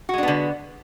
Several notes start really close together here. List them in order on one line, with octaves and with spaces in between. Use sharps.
F#4 G#3 D4 B3 D3